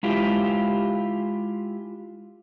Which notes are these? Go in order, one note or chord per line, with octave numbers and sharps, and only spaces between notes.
G#3 E4 F4 G4